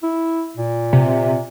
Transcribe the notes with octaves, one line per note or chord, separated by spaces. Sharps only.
E4
A#2
C3